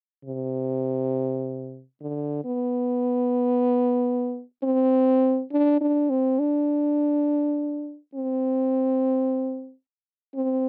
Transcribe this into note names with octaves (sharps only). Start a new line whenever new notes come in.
C3
D3
B3
C4
D4
D4
C4
D4
C4
C4